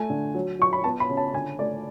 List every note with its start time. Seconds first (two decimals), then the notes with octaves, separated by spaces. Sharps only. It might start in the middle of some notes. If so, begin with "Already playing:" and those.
Already playing: A3 G#5
0.10 D3
0.35 F#3
0.59 F#3 C#6
0.73 B5
0.84 B3 A5
1.00 B5
1.09 C#3
1.17 A5
1.33 D3 G#5
1.59 A3 D5